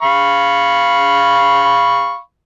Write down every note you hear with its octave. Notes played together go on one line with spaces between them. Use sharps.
F5 B5 C#6